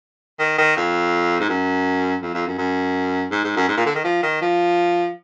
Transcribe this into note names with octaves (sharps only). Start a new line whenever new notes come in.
D#3
D#3
F2
G#2
F#2
F2
F2
F#2
F#2
G#2
G#2
F#2
G#2
A#2
D3
D#3
F3
D#3
F3